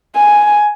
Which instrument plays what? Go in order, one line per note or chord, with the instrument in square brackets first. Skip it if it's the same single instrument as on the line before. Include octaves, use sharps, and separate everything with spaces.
[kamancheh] G#5